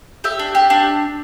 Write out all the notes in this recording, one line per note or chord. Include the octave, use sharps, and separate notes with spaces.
G4 E5
D4
G4
D4